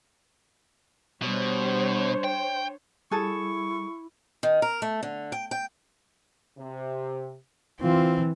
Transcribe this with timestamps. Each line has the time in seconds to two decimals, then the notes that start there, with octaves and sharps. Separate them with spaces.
1.22 B2 G3 D4 C5 C#5
2.24 G5
3.11 G3 E4 G#4 A4 C#6
4.43 D#3
4.62 A#4
4.82 A3
5.03 D3
5.32 G5
5.51 G5
6.58 C3
7.81 E3 C4 F4